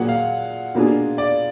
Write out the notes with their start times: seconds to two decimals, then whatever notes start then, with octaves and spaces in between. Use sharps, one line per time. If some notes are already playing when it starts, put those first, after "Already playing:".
Already playing: A#2 F#3 A#3 F4 G#4 F#5
0.08 F5
0.75 B2 A#3 D4 F4 G#4
1.18 D5